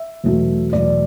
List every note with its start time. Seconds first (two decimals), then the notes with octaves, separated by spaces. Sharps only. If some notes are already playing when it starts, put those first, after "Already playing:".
Already playing: E5
0.24 E2 B2 F#3 A3
0.73 E2 B2 F#3 A3 D5